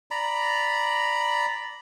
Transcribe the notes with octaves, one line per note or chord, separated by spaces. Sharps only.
D5 A#5 B5